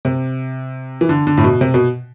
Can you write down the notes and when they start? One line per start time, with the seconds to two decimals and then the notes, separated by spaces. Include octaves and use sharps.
0.05 C3
1.01 E3
1.09 D3
1.27 D3
1.38 A2
1.44 B2
1.61 C3
1.74 B2